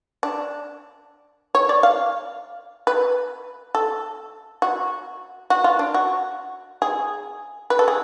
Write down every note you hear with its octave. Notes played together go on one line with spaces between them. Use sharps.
D4
C#5
D5
F5
B4
A4
F#4
F#4
F4
D4
F#4
G#4
B4
A4
G#4